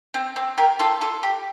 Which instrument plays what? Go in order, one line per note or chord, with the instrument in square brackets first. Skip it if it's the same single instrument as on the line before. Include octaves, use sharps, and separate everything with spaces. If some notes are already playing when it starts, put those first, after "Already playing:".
[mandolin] C4
C4
G4 A#4
F4 A4
F4 A4
G4